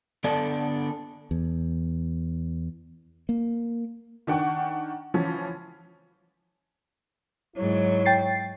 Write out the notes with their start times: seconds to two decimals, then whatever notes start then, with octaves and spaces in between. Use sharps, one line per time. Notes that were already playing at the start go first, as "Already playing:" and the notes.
0.24 D3 B3 D4 A4 D5 A5
1.31 E2
3.29 A#3
4.27 D#3 D4 F#5 G5 C#6
5.14 E3 F3 C#4
7.56 G#2 F#3 E4 C#5
8.06 G5 A6 C7